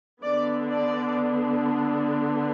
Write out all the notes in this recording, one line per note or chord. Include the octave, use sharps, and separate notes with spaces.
D3 B3 D4 D5
D5